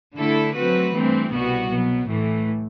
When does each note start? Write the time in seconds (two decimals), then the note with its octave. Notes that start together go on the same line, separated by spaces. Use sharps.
0.16 D3 A3 E4 A4
0.54 F#3 A3 C4 F#4 B4
0.93 G2 E3 A3 C4
1.31 C2 B2 G3 B3 F#4
1.70 B2 F#3 B3
2.08 A2 E3 A3